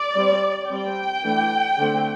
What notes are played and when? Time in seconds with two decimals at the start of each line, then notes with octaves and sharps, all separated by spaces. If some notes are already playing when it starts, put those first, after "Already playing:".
Already playing: D5
0.16 G3 C4
0.70 G3 C4 G5
1.24 E3 A3 D4
1.79 D3 A3 C4